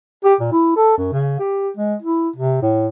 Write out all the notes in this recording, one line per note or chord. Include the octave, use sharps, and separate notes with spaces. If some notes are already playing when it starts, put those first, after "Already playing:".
G4
A#2
E4
A4
F#2
C#3
G4
G#3
E4
C3
A2